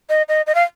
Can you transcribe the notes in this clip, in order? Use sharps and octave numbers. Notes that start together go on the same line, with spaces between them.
D#5
D#5
D#5
F5